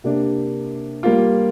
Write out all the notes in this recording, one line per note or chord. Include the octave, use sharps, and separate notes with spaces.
C3 A#3 D4 G4
G3 A#3 F4